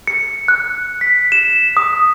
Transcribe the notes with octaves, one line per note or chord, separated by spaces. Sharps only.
C#7
F#6
B6
E7
D#6